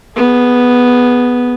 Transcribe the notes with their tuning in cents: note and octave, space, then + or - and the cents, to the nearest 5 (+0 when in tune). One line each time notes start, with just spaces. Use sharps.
B3 +0 G#4 +10